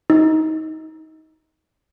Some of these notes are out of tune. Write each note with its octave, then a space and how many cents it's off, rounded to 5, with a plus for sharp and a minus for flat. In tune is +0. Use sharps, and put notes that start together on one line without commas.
D#4 +25